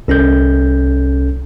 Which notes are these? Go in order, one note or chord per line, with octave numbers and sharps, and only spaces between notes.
C2 C#4 A4 G6